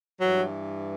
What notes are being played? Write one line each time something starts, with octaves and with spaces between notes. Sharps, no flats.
G2 E3 F#3